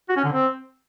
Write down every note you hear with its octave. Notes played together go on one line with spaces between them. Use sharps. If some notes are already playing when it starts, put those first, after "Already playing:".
F#4
C#4
D3
C4